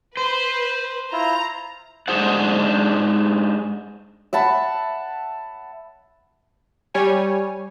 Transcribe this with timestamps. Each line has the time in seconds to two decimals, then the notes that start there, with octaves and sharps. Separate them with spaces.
0.17 B4 C5
1.13 E4 F4 A#5
2.08 G#2 D#3 D4 G#4 C5 F#5
4.33 E5 F#5 A5 B5
6.94 G3 C#5 G#5